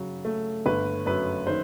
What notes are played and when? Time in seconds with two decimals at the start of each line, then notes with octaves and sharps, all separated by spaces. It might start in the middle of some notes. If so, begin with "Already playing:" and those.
Already playing: C#3 F#3
0.25 A3
0.66 G1 B4
1.06 F#2 B4
1.47 D#3 C5